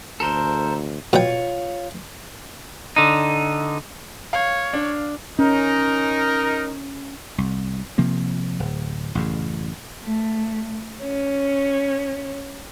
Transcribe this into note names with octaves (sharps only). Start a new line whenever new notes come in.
D2 A4 A#4 C5
B2 F4 C#5 G5
D3 D#4
C#5 F5
D4
C#4 D#4 A#4
C2
C3 F3 A#3
D1
A1 F#2 C#3
A3
C#4